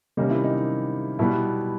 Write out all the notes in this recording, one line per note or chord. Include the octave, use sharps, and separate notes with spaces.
C3 D#3 G3 A#3 C#4 D#4
E4
D#4
B2 G3 B3 E4